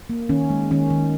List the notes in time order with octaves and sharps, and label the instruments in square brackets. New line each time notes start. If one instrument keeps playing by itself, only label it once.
[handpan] A#3
D#3 C#4
G#3
D#3 C#4
D#3